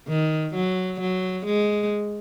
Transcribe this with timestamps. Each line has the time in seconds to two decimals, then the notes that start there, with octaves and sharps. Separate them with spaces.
0.08 D#3
0.54 F#3
1.01 F#3
1.46 G#3